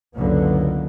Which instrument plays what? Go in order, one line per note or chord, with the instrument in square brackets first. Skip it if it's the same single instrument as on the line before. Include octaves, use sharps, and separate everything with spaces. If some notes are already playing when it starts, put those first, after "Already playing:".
[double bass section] F#1 C#2 D3 F#3 A#3 B3